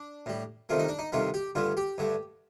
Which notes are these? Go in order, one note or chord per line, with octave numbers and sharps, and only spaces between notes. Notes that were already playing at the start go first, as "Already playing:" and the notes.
Already playing: D4
A2 G3
C2 C3 D#3 A3 F4
D#4
D4
D#4
C2 C3 D#3 A3 F4
G4
G2 D3 A3 F4
G4
G2 D3 A3